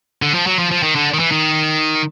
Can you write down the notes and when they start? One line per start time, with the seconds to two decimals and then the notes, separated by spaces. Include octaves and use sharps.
0.22 D3
0.34 F3
0.47 F#3
0.59 F3
0.71 F3
0.83 D#3
0.96 D3
1.14 D#3
1.19 E3
1.31 D#3